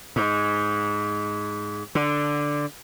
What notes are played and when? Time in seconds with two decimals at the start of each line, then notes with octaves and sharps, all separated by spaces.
0.16 G#2
1.95 D3